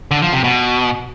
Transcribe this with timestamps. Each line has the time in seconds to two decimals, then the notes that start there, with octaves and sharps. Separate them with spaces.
0.11 D3
0.22 F3
0.33 C3
0.44 B2